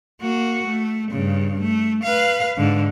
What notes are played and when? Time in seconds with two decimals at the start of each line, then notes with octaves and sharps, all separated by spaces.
0.21 A#3 F#4
0.66 A3
1.11 G2 C#3
1.61 A3
2.04 B4 F5
2.57 G#2 D3